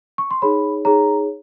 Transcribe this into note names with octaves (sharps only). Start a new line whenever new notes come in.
C#6
C6
D#4 G#4 C#5 B5
D#4 G#4 C#5 A#5